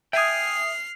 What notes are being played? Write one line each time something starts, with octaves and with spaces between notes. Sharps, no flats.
E5 G5 G#5 D#6 F6 C7